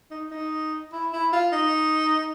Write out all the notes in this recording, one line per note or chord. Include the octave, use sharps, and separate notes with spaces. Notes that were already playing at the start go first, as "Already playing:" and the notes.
D#4
D#4
E4
E4
F4
D#4